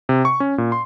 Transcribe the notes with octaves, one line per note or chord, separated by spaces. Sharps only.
C3
C#6
C#4
A#2
C6